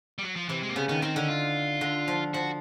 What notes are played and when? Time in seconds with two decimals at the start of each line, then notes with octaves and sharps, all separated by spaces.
0.18 G3
0.23 F#3
0.36 F3
0.49 C3 E3
0.63 G#3
0.69 A#3
0.76 C#3 B3
0.88 D#3 B3
1.02 D#3 C4
1.16 D3 C#4
1.28 F4
1.81 D3
2.08 F3
2.34 F3 F#4